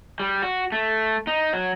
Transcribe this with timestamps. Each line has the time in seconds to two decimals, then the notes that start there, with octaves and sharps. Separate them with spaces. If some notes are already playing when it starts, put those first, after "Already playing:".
0.20 G3
0.42 F#4
0.72 A3
1.27 D#4
1.53 F#3